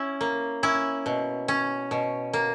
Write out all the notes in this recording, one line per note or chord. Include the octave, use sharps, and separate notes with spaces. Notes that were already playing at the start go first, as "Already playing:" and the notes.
Already playing: C#4 E4
A#3
C#4 E4
B2
C#4
B2
A#3